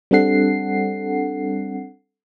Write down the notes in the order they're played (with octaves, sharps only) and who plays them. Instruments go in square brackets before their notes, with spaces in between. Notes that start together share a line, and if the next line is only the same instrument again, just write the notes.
[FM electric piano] G3 C4 D4 A4 F#5 C7